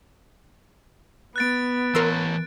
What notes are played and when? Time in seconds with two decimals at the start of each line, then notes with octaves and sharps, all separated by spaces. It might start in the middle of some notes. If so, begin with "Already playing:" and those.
1.36 B3 F#6 A6 D7
1.95 E3 A#4 C#5 C6 E6